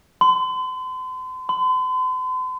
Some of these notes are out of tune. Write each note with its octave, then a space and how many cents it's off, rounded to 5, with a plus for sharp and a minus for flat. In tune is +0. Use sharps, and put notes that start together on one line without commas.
C6 -40
C6 -45